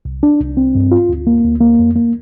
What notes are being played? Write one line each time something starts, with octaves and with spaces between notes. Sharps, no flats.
C2
D4
C2
C4
G2
F4
D2
A#3
D2
A#3
F2
A#3